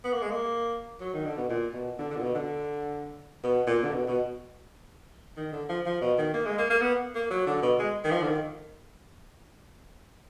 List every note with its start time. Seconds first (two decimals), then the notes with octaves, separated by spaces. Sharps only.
0.04 B3
0.13 A#3
0.22 G#3
0.31 A#3
1.01 F#3
1.14 D#3
1.25 D3
1.37 B2
1.49 A#2
1.74 B2
1.99 D3
2.11 D3
2.17 A#2
2.23 B2
2.35 D3
3.44 B2
3.67 A#2
3.84 D3
3.92 B2
4.08 B2
5.37 D#3
5.53 D3
5.69 F3
5.86 F3
6.01 B2
6.18 D#3
6.34 A#3
6.46 G#3
6.58 A#3
6.70 A#3
6.82 B3
7.15 A#3
7.30 F#3
7.46 D3
7.62 B2
7.79 G#3
8.04 D#3
8.11 F3
8.22 D3
8.28 D#3